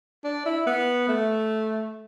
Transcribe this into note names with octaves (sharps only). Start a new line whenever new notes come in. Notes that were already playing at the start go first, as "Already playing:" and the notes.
D4
E4
B3
A3